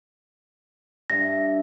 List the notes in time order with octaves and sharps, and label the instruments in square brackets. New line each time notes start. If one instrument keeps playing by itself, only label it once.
[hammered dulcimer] G2 E5 [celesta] A#6